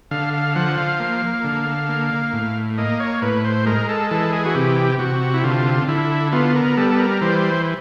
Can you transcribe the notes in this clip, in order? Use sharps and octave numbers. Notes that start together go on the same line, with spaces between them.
D3 F5
F5
F3 F#5
F5
A#3
D3
A#3
A2
A#3 D#5
C#5
A2 B4
C5
G#3 A#4
A4
E3 A4
G#4
F#4
C3 G4
C3 F#4
E4
D3 F4
D3 E4
B3 F4
A#4
G3 A4
A4
A#4
E3 C5